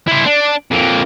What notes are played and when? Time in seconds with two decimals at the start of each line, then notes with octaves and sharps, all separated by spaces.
0.08 E4 C5
0.26 D4
0.71 F2 A#3